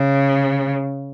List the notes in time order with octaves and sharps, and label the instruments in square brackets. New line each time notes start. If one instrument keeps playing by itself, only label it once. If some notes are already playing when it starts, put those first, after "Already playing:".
Already playing: [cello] C#3